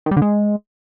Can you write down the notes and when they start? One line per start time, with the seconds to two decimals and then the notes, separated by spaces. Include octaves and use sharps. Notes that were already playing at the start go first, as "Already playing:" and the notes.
0.06 D#3
0.11 G3
0.17 D3
0.22 G#3